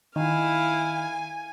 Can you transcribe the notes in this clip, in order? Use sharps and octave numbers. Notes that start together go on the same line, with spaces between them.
D#3 E4 F5 G#5